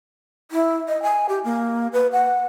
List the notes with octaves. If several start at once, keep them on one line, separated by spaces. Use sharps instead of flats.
E4
D#5
G#5
G4
A#3
B4
F#5